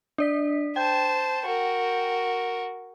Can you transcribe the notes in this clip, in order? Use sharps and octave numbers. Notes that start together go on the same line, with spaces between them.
D4 D5 B6
C5 G5 A5 G6
F#4 A#4